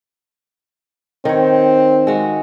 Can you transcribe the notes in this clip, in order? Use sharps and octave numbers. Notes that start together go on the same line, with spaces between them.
D#3 C4 C#5
G#3 F#4